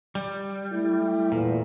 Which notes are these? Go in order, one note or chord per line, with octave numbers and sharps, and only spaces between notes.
G3
A3 E4
E2 A#2 E3 A3